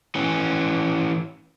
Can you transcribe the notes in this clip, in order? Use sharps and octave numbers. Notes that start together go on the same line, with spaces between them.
E3 C#4